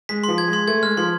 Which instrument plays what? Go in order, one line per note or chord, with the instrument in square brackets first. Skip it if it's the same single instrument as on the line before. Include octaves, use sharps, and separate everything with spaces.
[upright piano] G#3 [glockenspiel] B6
[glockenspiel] C6
[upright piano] F3
[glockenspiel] G#6
[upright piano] G#3
[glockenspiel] C6
[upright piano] A3 [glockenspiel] G#6
[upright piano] G#3 [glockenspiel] F6
[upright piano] F3 [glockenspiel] C6